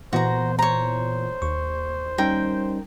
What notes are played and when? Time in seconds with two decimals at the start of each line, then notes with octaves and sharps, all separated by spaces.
0.13 A#2 E3 B3 F#4 C5 A#5
0.59 C5 C#5 A#5
1.42 D#2 C#6
2.18 G3 C#4 D#4 A#4 G5